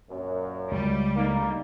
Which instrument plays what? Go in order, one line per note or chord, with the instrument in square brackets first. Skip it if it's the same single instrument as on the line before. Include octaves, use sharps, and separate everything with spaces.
[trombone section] F#2 [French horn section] A#2 C#5
[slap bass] C#2 [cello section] G3
[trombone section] D2 A#3 [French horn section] D#4